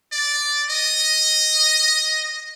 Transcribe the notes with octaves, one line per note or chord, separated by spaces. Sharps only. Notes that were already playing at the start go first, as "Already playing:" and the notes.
D5
D#5